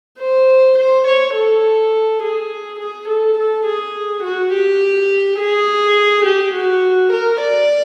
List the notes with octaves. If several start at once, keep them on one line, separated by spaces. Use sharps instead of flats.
C5
C5
C#5
A4
G#4
G#4
A4
A4
G#4
F#4
G4
G#4
G4
F#4
A#4
D5